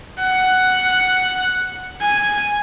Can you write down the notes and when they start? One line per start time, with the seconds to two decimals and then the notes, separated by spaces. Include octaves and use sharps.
0.20 F#5
2.02 G#5